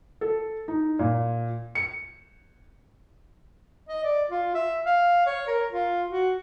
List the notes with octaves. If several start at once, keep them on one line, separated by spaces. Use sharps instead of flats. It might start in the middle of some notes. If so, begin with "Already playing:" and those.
A4
D#4
A#2
C#7
D#5
D5
F4
E5
F5
C#5
A#4
F4
F#4